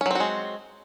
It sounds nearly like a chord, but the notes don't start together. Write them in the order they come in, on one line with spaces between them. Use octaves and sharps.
C#4 F#3 C4 F#4 G#3